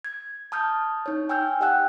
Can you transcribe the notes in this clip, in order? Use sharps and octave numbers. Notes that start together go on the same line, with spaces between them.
G#6
A5 D#6 F6 G6
D#4 C#5
G5 G#5 E6 F6 G6
G4 D#5 F#5 G5 E6 F#6